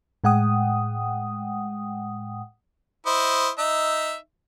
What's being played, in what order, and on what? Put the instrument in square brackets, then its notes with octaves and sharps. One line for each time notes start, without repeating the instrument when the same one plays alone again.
[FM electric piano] A2 G#3 F#5 G5 D#6
[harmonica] E4 C5 D#5
D#4 E5